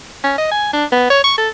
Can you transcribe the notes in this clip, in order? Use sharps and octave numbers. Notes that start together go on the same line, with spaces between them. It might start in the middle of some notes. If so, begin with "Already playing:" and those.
C#4
D#5
G#5
D4
B3
C#5
C#6
A4